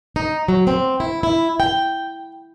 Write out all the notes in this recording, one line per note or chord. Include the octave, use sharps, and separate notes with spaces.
D#4
F#3
C4
E4
E4
G5